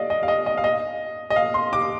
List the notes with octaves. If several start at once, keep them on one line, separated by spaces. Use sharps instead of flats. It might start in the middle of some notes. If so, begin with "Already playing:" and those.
Already playing: D5 D#5 F5
D#5
F5
D#5
D#5
F5
D#5
D#5
F5
C6
D6